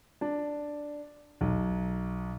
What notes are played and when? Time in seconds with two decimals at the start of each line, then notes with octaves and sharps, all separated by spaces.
0.21 D4
1.41 B1